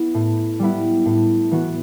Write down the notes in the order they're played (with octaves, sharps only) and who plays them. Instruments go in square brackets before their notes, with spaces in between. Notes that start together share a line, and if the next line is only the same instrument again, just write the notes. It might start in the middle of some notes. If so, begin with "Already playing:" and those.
Already playing: [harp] B3 E4
A2
G3 B3 E4
A2
E3 B3 F#4